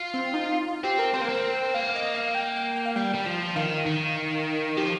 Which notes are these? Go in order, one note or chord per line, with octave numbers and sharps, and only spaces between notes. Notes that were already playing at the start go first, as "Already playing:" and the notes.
Already playing: F4
C4
D#4
F4
C4 G4
A#4
C4 C5
A#3
C4
A#4
G5
A#3 F5
D#5
F5
G5
G5
G5
F5
G3 G5
G3
F3
D#3 F5
D#3
F3 G4